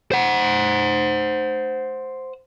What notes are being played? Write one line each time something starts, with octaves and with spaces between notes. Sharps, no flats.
C5 F#5